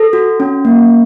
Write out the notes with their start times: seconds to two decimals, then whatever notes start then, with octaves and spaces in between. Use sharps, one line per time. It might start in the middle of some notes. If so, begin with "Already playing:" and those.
Already playing: A4
0.13 F#4
0.40 C#4
0.65 A#3